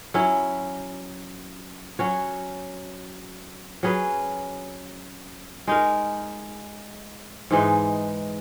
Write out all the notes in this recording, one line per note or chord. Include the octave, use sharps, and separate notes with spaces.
F#3 C#4 E4
F#3 C#4 F#4 C#5
F#3 C#4 G#4 B4
G#3 D#4 A#4
G#2 E3 G#3 D#4